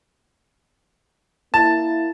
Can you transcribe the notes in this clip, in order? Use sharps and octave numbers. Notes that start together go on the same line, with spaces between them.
A#3 E4 A5